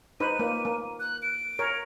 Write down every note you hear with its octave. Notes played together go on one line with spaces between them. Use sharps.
D#4 B4 C5 D#7
A#3
A#3
F#6
D7
A#4 C#5